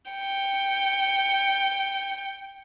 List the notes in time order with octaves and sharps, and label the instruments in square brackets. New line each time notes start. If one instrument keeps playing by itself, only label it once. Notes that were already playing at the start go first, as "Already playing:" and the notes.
[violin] G5 C#7